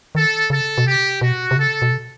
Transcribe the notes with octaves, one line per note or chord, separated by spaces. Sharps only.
D#3 A4
C#3 A4
B2
C3 G4
B2 F#4
C3
C#3 A4
B2
C3